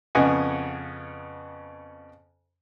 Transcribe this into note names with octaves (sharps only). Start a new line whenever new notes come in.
F2 C#3 B3 D#5 F#5 G#5